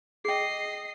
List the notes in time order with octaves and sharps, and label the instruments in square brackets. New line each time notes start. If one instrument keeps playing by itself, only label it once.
[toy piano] G#4 G5 [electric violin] D#5 C7